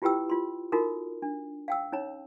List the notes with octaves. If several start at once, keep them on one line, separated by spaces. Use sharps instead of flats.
E4 F4 G4 B4 G5 E6
F4 C6
D#4 F4 F#4 A4 A#4
D4
F5 G5 E6
C#4 D#4 C#5 A#5